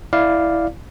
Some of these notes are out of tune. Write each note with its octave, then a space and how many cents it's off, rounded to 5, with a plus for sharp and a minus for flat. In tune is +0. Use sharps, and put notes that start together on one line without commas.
E4 +0 D5 +0 F5 +0